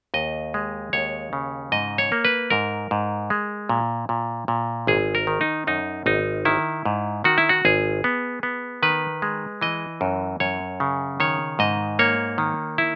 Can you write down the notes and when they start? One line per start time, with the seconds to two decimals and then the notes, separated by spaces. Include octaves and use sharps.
0.14 D#2 D#5
0.54 G#3
0.93 D#2 C#5
1.33 C#3
1.72 G#2 D#5
1.98 C#5
2.12 A#3
2.25 B4
2.50 G#2 A#4
2.91 G#2
3.30 G#3
3.69 A#2
4.09 A#2
4.48 A#2
4.87 G#1 G#4
5.15 A#4
5.27 D#3
5.41 D#4
5.67 F#2 D#4
6.06 G#1 D#4
6.45 D#3 E4
6.85 G#2
7.24 D#3 F#4
7.38 E4
7.49 F#4
7.65 G#1 G#4
8.04 B3
8.43 B3
8.83 D#3 B4
9.22 G#3
9.61 E3 D#5
10.01 F#2
10.40 F#2 C#5
10.80 C#3
11.20 D#3 C#5
11.59 G#2 D#5
11.99 A#3 C#5
12.38 D#3
12.78 E4